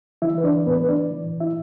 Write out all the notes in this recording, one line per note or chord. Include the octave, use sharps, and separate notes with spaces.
E3 E4 E5
B4
E3 D4 D5
A2 B3 B4
B4
E3 D4 D5
E3
A2
E4 E5